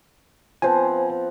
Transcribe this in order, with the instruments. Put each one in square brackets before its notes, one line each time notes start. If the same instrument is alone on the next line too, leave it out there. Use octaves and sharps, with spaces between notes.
[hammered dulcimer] F3 B3 C4 [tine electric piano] C5 G#5